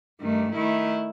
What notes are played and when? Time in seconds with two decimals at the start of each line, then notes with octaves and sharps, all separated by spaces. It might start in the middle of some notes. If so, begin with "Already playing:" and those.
0.20 G2 D#3 A3
0.53 D#3 A3 E4